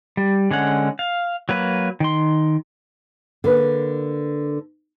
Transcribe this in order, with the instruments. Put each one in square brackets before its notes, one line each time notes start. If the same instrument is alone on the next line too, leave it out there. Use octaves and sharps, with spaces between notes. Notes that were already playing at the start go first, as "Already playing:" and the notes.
[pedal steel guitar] G3
D3 G#3 C#4 F#5
F5
F#3 A#3 B4
D#3 C6
[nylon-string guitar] D3 A#3 B4